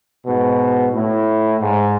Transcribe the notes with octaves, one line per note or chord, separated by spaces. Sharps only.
G#2 B2
A2
G#2